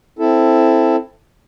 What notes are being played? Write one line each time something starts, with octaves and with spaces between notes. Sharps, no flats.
C4 E4 A4